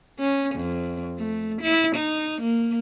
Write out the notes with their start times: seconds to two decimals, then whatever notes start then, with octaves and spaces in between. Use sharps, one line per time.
0.19 C#4
0.56 F2
1.18 A3
1.62 E4
1.95 D#4
2.42 A#3